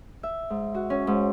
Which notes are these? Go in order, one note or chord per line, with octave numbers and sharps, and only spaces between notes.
E5
G#2
F#4
C#4
G#2